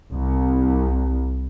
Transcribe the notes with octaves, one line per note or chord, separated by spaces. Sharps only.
C2